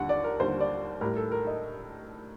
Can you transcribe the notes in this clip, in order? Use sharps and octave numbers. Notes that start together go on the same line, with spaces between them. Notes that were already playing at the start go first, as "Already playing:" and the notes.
Already playing: D#2 D3 G3 F#5
D5
A#4
D#2 D3 G3 C5
D5
A2 G3 A#4
A4
A#4
D#5